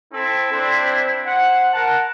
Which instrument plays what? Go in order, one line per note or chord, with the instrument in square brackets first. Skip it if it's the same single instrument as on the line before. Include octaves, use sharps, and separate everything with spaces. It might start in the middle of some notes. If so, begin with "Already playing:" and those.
[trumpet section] C4 A4 [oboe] E4
[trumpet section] C4 D4 C5
C5 F#5
[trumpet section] A#4 A5 [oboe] F#5